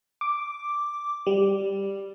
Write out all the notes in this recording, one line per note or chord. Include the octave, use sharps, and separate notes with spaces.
D6
G3